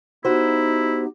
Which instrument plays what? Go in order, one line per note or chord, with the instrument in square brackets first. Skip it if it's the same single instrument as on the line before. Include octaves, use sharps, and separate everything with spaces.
[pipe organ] B3 G4 [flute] D#4 [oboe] E4 [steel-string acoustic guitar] F#4 C5